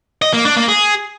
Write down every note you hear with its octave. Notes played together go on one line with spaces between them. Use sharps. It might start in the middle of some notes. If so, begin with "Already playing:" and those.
D#5
A#3
D4
A#3
G#4